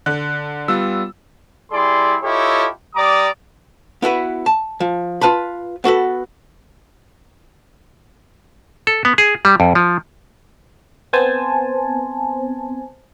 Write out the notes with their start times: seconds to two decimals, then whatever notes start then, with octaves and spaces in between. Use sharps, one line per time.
0.06 D3 F#6
0.68 G3 B3 F4 E6
1.72 G3 E4 G#4 D5 C6
2.23 E4 F4 G4 A4 C#5 D#5
2.95 G3 D5 A#5 D6 D#6
4.02 B3 E4 F#4 B4
4.46 A5
4.80 F3
5.21 F4 B4 A5 B5
5.84 B3 F#4 A4 B4
8.87 A4
9.05 B3
9.18 G#4
9.45 G3
9.60 F2
9.75 F3
11.13 B3 C4 C5 G#5 A5